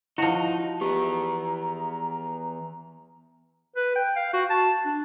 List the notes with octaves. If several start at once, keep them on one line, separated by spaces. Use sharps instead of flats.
F3 D#4 E4 F#4 A5
E2 E3 B3 G4 A#5
B4
G5
F5
F#4
A5
D4